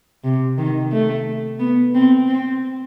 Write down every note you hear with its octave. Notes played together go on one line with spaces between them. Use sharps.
C3
D#3
A3
B3
C4
C4